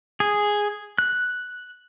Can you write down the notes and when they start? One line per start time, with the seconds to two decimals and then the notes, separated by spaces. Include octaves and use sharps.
0.20 G#4
0.98 F#6